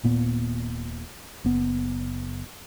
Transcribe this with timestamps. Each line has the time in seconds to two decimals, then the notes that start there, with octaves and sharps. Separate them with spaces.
0.03 D#1 A#2 B3
1.44 F#1 B3